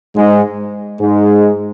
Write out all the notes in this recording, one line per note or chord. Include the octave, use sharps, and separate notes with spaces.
G#2 G#3
G#2 G#3